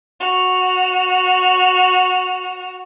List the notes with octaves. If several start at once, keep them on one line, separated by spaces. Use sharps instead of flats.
F#4 F7